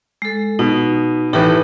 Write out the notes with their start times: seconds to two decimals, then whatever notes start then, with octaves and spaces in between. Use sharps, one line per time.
0.22 G#3 A4
0.59 B2 D#4
1.33 A2 E3 D#4 G4 A4